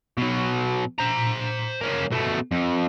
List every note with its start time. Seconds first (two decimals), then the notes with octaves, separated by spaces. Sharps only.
0.18 B2 F#3
0.99 C5 A#5
1.81 A#3 C#4
2.11 B2 A3
2.51 F2